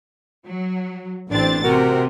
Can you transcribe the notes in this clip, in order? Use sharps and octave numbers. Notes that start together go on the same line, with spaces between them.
F#3
A1 C4 D4 A6
C3 F#4 A#4